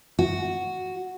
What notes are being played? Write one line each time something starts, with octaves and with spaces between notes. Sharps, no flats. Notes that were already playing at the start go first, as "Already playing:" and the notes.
F#4